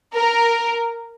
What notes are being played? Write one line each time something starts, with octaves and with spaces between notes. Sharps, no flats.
A#4